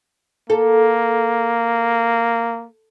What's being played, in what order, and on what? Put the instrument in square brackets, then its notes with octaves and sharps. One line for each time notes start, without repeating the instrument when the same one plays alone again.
[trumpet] A#3 [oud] A4